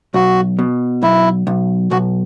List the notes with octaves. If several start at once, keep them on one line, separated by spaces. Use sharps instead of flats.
B1 F#4
B2
B1 E4
B1
B1 F#4